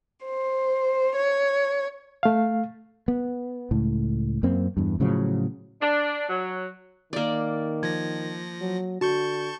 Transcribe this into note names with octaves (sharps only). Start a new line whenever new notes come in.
C5
C#5
A3 F5
B3
C#2 A2
F#2 A#3 C4
E2 G2
A2 C#3 F3 F#3
D4
F#3
D#3 A#3 D5
F3 G#6 A#6
F#3
D3 F#4 A5 C#6 G6